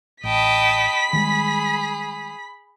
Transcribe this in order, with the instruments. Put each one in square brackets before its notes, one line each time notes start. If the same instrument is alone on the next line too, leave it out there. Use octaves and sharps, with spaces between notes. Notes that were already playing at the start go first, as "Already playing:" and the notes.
[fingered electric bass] A1 [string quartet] D#5 G5 A5 [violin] B5 B6
[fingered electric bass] D#3 G3 G#3 [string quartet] G#4